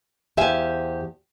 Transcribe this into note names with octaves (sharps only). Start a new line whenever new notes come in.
E2 G4 C5 E5 F5 G#5